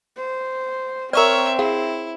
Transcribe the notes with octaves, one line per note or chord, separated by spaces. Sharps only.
C5
C4 A#4 C#5 D5 E5 A#5 C#6 F6
E4 G#4 F5